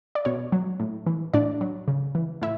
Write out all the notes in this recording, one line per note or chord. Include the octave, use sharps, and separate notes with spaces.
D5
B2 C#5
F#3
A2
E3
A2 D4 D5
F#3
C#3
E3
A2 E4 E5